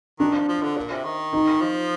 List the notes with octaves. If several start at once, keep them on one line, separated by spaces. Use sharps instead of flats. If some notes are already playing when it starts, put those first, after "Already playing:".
D#3 D4
F3
F3
D3
A#2
C3
D#3
D#4
F3